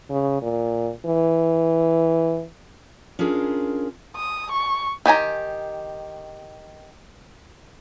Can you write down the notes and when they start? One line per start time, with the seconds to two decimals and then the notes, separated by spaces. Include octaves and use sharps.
0.10 C#3
0.42 A#2
1.06 E3
3.19 C#4 D4 F4 G#4 A#4
4.16 D#6
4.51 C#6
5.06 D#3 G4 G#5 A#5